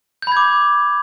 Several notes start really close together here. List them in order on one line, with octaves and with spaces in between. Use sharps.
G6 B5 G#6 D6